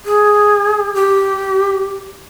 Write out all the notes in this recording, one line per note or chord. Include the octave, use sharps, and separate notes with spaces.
G#4
G4